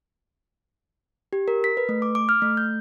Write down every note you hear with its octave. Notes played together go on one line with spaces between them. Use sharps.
G4
A#4
B6
B4
A3
D6
D6
F6
A3
G6